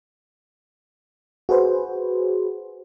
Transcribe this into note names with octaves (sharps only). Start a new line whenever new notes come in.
F#4 G#4 B4 C5